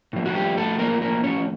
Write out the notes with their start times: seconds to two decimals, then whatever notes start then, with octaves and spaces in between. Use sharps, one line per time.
0.13 A2 F3
0.26 F#4
0.35 G3 G4
0.57 A3 A4
0.79 A#3 A#4
1.01 A#3 A#4
1.23 C#4 C#5